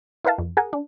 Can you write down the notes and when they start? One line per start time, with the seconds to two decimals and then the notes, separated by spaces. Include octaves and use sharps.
0.25 E4 A#4 B4 F5 A5
0.38 F2
0.57 G#4 A#4 F#5 G#5
0.73 D4